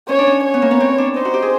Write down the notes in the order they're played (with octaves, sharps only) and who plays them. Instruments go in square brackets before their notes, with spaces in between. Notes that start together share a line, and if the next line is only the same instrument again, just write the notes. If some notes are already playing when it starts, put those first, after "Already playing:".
[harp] C#4 [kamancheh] C#5
[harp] D4
C#4
[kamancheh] C#5
[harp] B3
A#3
B3
C4
D4
[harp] D#4 [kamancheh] C5
[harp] F#4
G4
G#4